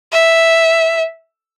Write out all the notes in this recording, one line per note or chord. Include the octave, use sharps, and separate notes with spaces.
E5